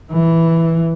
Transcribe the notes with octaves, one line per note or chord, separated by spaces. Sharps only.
E3